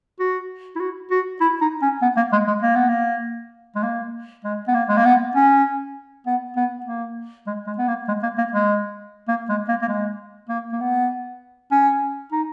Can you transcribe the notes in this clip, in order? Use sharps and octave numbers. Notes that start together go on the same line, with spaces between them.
F#4
E4
F#4
F#4
E4
D#4
C#4
B3
A#3
G#3
G#3
A#3
B3
A#3
G#3
A#3
G#3
B3
A#3
G#3
A#3
B3
C#4
B3
B3
A#3
G#3
G#3
B3
A#3
G#3
A#3
A#3
G#3
A#3
G#3
A#3
A#3
G#3
A#3
A#3
B3
C#4
D#4